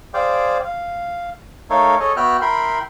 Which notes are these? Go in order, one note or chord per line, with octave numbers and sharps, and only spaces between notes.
G#4 C5 D5 F5 G5
F5
A3 D#4 A4 A#4 C#5 F5
G#4 A4 C#5 D#5
B3 F#4 E5 G5 F6 F#6
E4 A#4 G5 B5 C6